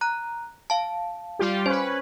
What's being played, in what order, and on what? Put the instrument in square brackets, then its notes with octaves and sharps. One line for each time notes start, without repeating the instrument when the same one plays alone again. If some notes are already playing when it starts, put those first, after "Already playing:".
[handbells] A#5 F#6
F5 A5
[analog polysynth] G3 F4 G4
[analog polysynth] C#4 B4 [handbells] C5